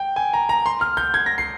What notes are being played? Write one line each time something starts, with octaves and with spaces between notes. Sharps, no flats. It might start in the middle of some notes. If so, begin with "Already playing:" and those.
Already playing: G5
G#5
A#5
A#5
C6
F6
G6
G#6
A#6
C7